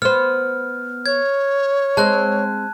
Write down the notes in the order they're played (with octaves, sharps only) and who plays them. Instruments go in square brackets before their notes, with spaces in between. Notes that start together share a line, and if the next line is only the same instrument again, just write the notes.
[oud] B3 C5 [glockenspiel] F6
[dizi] C#5 [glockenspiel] G#6
[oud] G#3 C4 [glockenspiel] A5 F#6